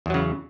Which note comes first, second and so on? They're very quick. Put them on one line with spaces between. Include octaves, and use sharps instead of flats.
E2 F#3 C#3